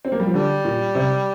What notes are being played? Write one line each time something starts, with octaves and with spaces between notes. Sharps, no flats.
C4
A#3
G3
F3
D3 G3
A#2
C3